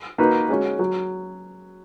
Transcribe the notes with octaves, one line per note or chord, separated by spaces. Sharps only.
A#3 D#4 F#4 B4
G#3 C#4 F#4
F#3